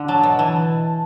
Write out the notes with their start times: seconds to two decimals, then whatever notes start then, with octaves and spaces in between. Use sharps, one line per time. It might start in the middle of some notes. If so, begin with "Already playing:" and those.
Already playing: D3
0.08 F#3 A5
0.23 B2
0.39 E3